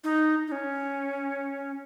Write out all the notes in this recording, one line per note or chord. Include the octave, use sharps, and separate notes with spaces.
D#4
D#4
C#4